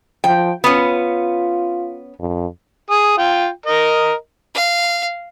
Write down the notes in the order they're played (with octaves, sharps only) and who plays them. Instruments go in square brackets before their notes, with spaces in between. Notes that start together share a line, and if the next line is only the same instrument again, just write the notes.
[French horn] F3 [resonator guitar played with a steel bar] G5
[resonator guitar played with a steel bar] B3 C#4 [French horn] F4
[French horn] F2
[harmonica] G#4 D#6
F4 G5
A#4 D#5
[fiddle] F5